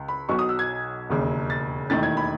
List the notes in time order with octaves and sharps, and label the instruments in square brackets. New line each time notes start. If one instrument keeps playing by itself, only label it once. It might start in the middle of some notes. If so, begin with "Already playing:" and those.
Already playing: [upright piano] C#2
B5
B1 B2 F#3 C#6
D#6
E6
G#6
E1 D#2 C#3
A6
E1 D#2 D#3 A3 E4 A6
G#6
B5